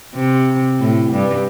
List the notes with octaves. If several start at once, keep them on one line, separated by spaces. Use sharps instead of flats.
C3
A2
G2